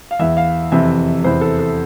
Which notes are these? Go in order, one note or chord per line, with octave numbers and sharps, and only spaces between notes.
F5
E2 E3 E5
F5
F2 C3 E3 E5
E2 C3 E3 C5
A4
A4